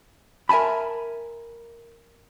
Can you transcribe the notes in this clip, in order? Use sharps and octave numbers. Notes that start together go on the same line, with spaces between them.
A#4 E5 G#5 A5 B5